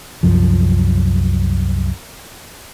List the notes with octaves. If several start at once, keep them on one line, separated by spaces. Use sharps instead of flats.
C2 F#2 F3